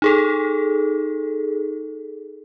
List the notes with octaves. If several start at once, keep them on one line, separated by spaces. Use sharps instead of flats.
D#4 G#4 A4